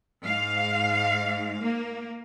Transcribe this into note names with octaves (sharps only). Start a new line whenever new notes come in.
G#2 F5
A#3